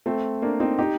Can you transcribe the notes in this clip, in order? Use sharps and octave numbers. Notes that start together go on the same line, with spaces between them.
A3 C4
A#3 D4
C4 D#4
D#4 G4